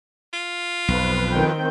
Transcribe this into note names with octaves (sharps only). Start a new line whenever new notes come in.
F4
B1 F2 F3 B4
D#3 C4 G5